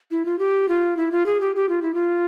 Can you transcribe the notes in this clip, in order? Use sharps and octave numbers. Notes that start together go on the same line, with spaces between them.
E4
F4
G4
F4
E4
F4
G#4
G4
G4
F4
E4
F4